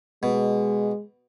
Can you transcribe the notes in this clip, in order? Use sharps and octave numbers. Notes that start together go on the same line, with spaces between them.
B2 G#3